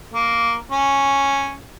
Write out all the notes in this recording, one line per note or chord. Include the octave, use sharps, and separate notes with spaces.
A#3
C#4